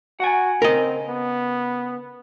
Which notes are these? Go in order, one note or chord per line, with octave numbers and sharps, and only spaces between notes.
F#4 F#5 G#5
C#3 C4 A#4 D#5
B3